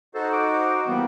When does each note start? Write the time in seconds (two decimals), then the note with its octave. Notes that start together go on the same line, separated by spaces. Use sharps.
0.15 D#4 F#4 A4 C5
0.33 D6
0.87 E3 G3 A#3 B3